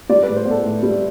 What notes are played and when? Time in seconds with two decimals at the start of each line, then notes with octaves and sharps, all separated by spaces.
0.09 G3 D5
0.23 B4
0.27 A2
0.36 C5
0.45 B3
0.51 A4
0.64 A2
0.83 G3